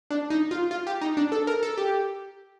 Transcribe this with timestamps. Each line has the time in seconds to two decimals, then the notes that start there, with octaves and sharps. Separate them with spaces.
0.10 D4
0.30 D#4
0.51 F4
0.71 F4
0.87 G4
1.01 D#4
1.17 D4
1.32 A4
1.47 A#4
1.63 A4
1.78 G4